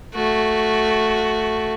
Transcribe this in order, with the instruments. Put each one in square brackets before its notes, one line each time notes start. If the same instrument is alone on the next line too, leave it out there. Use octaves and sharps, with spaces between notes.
[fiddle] A3 F#4